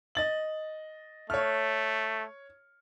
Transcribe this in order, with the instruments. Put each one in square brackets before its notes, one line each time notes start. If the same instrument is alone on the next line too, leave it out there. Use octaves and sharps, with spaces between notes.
[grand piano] D#5 A6 F#7
[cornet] A3 [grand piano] C#5 F6